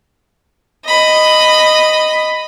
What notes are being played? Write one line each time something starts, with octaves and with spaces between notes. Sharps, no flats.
D#5 B5